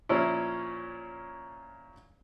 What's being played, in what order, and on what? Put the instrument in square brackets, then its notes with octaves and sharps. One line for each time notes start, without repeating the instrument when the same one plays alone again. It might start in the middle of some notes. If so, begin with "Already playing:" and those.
[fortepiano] A#2 F3 C#4 E4